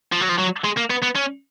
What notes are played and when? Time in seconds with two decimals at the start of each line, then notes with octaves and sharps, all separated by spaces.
0.12 F3
0.20 F#3
0.29 F3
0.38 F#3
0.64 G#3
0.77 A#3
0.90 B3
1.02 B3
1.15 C#4